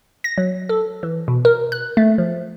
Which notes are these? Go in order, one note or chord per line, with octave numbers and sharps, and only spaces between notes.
A#6
F#3
A4
E3
B2
A#4
F#6
A3
F3